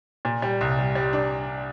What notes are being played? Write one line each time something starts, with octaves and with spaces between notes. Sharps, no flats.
A#2
G3
C2
G3
G3
D4